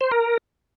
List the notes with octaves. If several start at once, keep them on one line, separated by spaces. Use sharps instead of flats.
C5
A#4